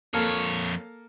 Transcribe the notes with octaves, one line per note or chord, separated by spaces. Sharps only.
F2 A#3 A4 C#5 F6